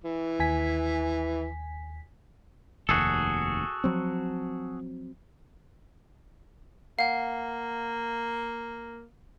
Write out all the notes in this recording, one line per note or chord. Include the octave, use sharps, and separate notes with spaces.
E3
D#2 G#5 B6
F1 D#2 F#4 G#4 A4
F3 F#3 C4
A#3 F5 F#5